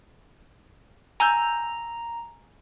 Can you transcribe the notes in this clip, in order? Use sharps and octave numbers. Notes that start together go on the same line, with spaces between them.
G#5 A#5 E6 G6